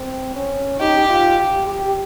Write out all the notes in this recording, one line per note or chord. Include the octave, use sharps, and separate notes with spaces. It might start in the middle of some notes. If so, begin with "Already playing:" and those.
Already playing: C4
C#4
D#4 G4
F4
G4
G4